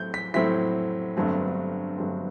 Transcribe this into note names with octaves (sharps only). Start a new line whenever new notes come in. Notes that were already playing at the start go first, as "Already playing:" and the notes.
Already playing: A2 F#3 C4 E4 G6
B6
A2 F#3 C4 E4 B6
G1 G2 F#3 A3 C4
G1 G2 F#3 A3 C4